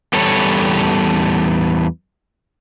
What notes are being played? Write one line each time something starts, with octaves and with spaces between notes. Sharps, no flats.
E2 G3 A4 C#5